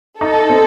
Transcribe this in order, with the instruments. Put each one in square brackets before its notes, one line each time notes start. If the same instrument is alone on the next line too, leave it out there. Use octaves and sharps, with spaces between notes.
[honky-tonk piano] D#4 [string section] A4
[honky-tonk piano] C4